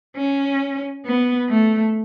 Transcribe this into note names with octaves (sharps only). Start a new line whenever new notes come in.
C#4
B3
A3